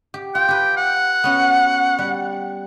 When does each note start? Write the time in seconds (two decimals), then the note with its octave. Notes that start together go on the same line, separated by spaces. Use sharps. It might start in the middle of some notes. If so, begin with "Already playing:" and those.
0.14 G4
0.35 F4 G5
0.48 G4 B4
0.77 F#5
1.24 B3 C#4 F#4
1.99 G3